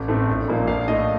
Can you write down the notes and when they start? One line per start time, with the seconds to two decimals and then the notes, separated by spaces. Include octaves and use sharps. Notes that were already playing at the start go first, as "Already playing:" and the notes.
Already playing: A1
0.08 A2 A3 C4
0.28 A#1
0.48 A#2 F3 A#3 D#4
0.67 A#1 F5
0.88 A2 A3 D#5